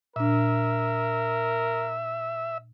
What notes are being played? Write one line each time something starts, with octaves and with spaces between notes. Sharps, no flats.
A#2 D4 A#4 E5